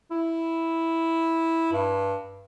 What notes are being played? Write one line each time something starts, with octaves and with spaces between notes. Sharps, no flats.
E4
G2